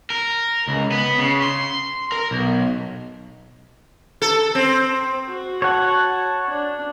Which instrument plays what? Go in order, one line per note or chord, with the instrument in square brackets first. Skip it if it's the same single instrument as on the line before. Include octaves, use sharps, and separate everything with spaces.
[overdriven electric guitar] A#4
C#2
B3
C#3
C6
A#4
B1
[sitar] A4
C4
[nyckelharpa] F#4
[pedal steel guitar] C#5 F#5 [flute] A5
[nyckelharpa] D4